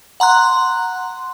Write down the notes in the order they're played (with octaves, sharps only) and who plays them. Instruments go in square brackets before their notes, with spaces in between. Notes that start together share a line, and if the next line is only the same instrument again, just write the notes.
[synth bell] F#5 A#5 C6 F#6